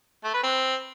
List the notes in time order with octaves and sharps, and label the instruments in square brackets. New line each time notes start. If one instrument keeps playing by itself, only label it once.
[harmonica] A3
B4
C4